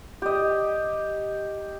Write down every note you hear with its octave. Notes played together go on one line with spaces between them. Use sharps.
G4 D#5